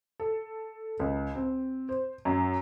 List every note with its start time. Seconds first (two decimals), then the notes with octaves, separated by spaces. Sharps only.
0.20 A4
1.00 C#2
1.35 C4
1.89 C5
2.25 F#2